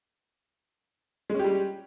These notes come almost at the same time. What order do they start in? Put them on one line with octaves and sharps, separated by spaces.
G#3 C#4 G4 G3